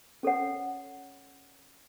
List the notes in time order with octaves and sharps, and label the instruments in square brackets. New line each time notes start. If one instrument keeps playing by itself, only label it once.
[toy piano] C#4 A4 C#5 F#5